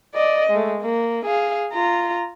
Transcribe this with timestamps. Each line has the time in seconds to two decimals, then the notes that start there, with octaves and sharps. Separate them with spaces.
0.15 D5 D#5
0.50 G#3 A3
0.82 A#3
1.26 G#4 F5
1.73 F4 A#5